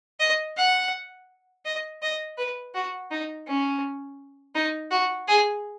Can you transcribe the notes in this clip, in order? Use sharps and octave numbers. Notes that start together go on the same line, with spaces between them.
D#5
F#5
D#5
D#5
B4
F#4
D#4
C#4
D#4
F#4
G#4